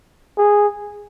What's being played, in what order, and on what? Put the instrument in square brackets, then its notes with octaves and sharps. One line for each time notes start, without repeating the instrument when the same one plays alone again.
[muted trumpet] G#4